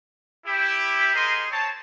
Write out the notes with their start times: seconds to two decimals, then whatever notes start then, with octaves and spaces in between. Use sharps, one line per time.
0.46 E4 G4
1.14 D#4 G#4 A#4 C5 D#5 C6
1.51 C4 C#5 A5